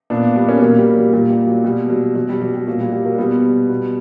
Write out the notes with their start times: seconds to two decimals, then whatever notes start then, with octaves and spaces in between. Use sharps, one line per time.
0.10 A#2 B3 D4
0.36 G3 B3
0.48 A#3 C#4
0.61 A#2 F#3 A#3
0.79 G3
0.96 F#3
1.13 A#2 G3
1.30 G3
1.47 F#3
1.64 B2 G3
1.90 F#3
2.15 B2 F#3
2.29 G3
2.42 F#3
2.54 G3
2.67 A#2 F#3
2.80 G3
2.93 G3
3.05 F#3 A#3
3.18 B2 G3 B3
3.69 B2